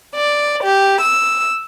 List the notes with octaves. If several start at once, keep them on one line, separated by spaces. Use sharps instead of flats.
D5
G4
E6